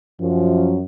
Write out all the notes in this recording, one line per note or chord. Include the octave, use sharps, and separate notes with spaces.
F#2 F3